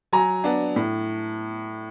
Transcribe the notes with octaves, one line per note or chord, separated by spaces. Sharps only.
F#3 G#5 A#5
B3 D4
A2